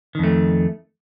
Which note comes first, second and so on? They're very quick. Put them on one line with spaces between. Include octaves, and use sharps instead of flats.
D#3 F2 A3